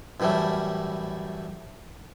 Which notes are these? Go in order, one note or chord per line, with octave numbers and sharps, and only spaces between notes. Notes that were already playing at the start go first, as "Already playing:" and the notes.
F#2 A2 E3 G3 A3